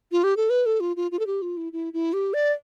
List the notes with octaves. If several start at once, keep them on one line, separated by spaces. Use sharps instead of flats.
F4
G4
A4
B4
A4
F4
F4
F4
A4
G4
F4
E4
E4
E4
G4
D5